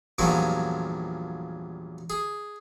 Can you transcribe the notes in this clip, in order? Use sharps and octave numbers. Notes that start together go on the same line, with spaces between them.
E2 G2 A#2 F3 F#3 C#4
G#4